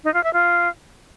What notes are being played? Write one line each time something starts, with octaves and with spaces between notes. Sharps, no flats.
D#4
F4
E5
F4